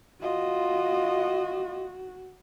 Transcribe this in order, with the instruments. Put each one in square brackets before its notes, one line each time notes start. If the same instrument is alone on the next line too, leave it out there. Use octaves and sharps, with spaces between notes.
[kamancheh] F4 D#5 [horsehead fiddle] F#4